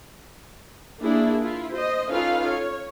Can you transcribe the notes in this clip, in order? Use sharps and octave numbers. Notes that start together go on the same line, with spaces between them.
A#3 D4 E4 F#4 G#4
E4 F4
C5 D#5
C#4 D#4 F4 A4 B4 F5
C#5